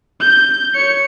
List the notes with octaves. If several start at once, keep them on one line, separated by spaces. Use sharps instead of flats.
G6
C#5 C#7